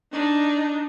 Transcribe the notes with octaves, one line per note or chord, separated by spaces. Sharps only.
D4 D#4